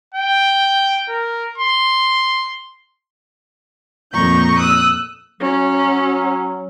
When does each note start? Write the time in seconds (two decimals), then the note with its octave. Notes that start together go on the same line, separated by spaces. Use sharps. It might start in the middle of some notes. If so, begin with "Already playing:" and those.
0.14 G5
1.09 A#4
1.58 C6
4.13 F2 A#2 A#5 C#6 G6
4.58 D#6 E6 F#6
5.41 F#3 C#4